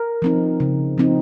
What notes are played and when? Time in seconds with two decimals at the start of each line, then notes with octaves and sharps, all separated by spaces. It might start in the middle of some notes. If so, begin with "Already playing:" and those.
Already playing: A#4
0.22 F3 C4 D#4
0.60 C#3
0.98 F3 C4 D#4